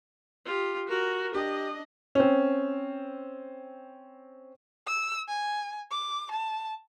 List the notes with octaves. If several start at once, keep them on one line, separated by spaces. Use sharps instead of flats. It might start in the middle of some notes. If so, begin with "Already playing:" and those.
F4 G4
F#4 A#4
D4 G4 D#5
C4 C#4
E6
G#5
D6
A5